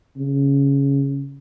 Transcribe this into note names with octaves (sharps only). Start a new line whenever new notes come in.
C#3